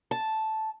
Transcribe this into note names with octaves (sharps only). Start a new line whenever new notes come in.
A5